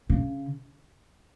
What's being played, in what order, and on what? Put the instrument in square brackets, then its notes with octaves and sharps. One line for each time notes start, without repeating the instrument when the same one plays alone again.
[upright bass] C#3